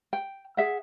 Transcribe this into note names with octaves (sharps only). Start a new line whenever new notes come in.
G5
G#4 E5 F#5